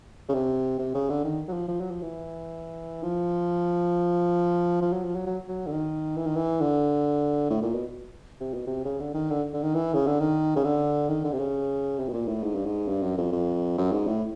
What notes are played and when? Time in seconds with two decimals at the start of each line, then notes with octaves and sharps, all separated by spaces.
0.29 C#3
0.34 C3
0.79 C3
0.95 C#3
1.10 D3
1.24 D#3
1.48 F#3
1.53 F3
1.68 F3
1.80 F#3
1.91 F3
2.02 E3
3.03 F3
4.82 F3
4.93 F#3
5.05 F3
5.16 F#3
5.27 F#3
5.48 F#3
5.67 D3
5.72 D#3
6.17 E3
6.26 D#3
6.36 E3
6.61 D3
7.50 A2
7.62 A#2
7.74 B2
8.40 C3
8.54 B2
8.67 C3
8.85 C#3
9.00 D3
9.14 D#3
9.30 D3
9.54 D3
9.63 D#3
9.75 E3
9.94 C#3
10.07 D3
10.20 D#3
10.56 C#3
10.65 D3
11.09 D#3
11.24 D3
11.33 C3
11.39 C#3
11.99 C3
12.09 B2
12.13 A#2
12.28 A2
12.43 G#2
12.55 G2
12.66 G#2
12.88 G2
13.03 F#2
13.18 F2
13.32 F2
13.78 F#2
13.92 G#2
14.07 A2